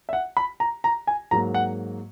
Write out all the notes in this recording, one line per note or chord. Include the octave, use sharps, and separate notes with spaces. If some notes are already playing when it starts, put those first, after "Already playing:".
E5
F#5
B5
A#5
A#5
G#5
G#2 F#3 A#3 A#5
F#5